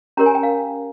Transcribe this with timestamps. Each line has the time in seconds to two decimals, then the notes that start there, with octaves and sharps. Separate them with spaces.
0.17 C#4 G4 A#4 C#5 A#5
0.26 G#5
0.35 G5
0.43 F5